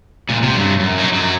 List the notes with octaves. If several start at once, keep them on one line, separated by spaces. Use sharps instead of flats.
C#2 A#2
C3
G2 F#3
F#2
F#3 D#4
F#2 F#3